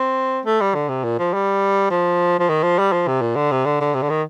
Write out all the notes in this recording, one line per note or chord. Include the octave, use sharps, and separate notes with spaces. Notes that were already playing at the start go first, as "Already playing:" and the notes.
Already playing: C4
A3
G3
D3
C3
A#2
F3
G3
F3
F3
D#3
F3
G3
F3
C3
A#2
D3
C3
D3
D3
C3
D3
D#3